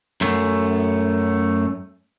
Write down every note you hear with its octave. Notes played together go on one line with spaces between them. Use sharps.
F#2 A3